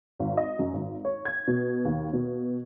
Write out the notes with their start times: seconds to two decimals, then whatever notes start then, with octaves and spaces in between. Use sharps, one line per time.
0.19 G#1
0.37 D#5
0.59 F#2
0.73 G#1
1.05 C#5
1.25 G#6
1.47 B2
1.85 D#2
2.13 B2